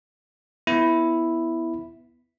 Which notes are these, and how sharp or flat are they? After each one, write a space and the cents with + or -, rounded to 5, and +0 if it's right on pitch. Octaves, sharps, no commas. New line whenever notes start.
B3 +0 E4 +0